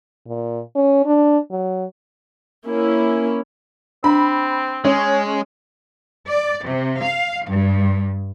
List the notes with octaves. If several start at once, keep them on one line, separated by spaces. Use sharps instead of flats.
A#2
C#4
D4
F#3
A#3 C#4 E4
C4 D4 B5
G#3 C#4
D5
C3
F5
G2